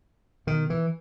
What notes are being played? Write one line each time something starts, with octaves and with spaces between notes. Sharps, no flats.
B2 D#3
E3